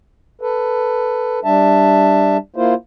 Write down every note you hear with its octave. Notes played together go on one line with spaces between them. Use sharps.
A4 B4
G3 D4 E5 A5
A#3 E4 F4 C5